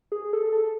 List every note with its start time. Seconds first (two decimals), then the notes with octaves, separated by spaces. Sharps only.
0.12 G#4
0.33 A4
0.52 A4